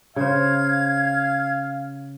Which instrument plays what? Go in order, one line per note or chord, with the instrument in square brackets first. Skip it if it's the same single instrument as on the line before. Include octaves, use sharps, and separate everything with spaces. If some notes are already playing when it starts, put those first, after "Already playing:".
[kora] C#3 C5 [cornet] F5 [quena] G#6